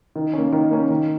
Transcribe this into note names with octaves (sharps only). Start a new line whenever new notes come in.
D#3
A#3 C#4
D#3
A#3 C#4
D#3